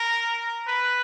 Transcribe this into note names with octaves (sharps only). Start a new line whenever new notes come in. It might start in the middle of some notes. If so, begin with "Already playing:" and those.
Already playing: A#4
B4